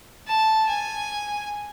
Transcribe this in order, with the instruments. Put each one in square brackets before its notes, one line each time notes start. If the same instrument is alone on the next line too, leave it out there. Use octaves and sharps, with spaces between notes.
[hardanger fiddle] A5
G#5